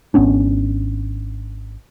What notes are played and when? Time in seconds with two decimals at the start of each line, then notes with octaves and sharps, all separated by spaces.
0.14 G#1 B3 C#4 D4